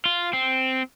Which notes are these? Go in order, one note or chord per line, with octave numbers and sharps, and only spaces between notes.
F4
C4